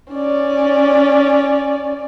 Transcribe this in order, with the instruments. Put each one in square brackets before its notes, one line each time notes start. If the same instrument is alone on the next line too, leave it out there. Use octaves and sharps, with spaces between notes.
[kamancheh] C#4 D5